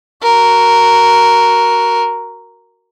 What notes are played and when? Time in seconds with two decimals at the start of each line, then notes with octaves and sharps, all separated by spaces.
0.23 F#4 A#4